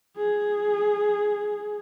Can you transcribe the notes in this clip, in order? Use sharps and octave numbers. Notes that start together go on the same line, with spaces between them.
G#4